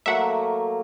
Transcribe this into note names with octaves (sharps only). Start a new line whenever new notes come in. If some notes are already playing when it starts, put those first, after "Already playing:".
F#3 A3 A#3 E5 F#5